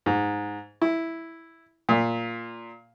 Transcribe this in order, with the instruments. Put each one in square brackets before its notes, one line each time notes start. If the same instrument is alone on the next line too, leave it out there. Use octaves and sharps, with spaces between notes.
[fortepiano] G#2
E4
A#2